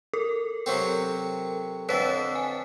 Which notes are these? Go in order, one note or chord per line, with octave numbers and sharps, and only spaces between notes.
A4 A#4
C3 F#3 C4
F2 D3 B4 C#5 B6
G#5